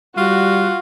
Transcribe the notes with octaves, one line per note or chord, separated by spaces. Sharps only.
G3 F4 F#4